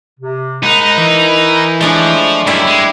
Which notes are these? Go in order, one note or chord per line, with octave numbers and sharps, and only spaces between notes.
C3
G#2 D#4 A#4 F#5 B5
E3
F3 G#3 A3 D4 B5 C#6 D6
F#2 G3 E4 D5 E5
G#3